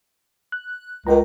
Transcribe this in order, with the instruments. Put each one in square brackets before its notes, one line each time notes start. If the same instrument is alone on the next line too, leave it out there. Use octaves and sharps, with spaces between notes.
[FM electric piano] F#6
[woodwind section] C#2 [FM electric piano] A#4 G5 A#5